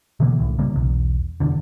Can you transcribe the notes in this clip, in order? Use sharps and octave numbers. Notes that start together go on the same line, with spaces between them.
B2 D3 E3 A#3
C2 A2
C#3 G3 A#3
B1 E2
F1 A#1 E2 D3